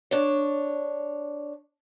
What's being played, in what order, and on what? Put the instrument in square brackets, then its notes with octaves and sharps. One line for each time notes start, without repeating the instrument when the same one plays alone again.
[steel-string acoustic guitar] D4 C#5